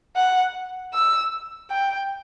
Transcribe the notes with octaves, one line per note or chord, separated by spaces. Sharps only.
F#5
E6
G5